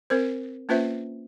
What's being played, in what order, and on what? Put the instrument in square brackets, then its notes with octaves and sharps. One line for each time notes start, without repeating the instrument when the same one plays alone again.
[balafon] C4 A#4 C5
A#3 C#4 F4 B4 C5 E5